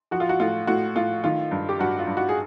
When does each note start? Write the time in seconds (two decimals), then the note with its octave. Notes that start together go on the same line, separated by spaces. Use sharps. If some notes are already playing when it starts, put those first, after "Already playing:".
0.11 F3 F#4
0.20 F4
0.29 F#4
0.40 A2 F4
0.67 A2 F#4
0.96 A2 F4
1.24 D#3 F4
1.51 G2
1.69 G4
1.79 G2 F#4
1.99 F4
2.07 G2
2.17 F#4
2.29 G#4